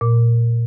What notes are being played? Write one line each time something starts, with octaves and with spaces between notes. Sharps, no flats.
A#2